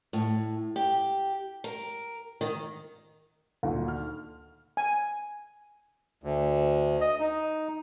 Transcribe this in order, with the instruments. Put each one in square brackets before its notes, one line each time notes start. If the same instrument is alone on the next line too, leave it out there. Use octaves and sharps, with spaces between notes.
[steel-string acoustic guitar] A2
G4
A#4
D#3
[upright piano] D2 D#3 [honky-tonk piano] A#2
[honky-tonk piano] F6
[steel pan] G#5
[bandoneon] D2
D#5
D#4